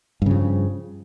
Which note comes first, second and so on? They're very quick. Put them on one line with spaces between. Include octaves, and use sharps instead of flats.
G2 C#3 F3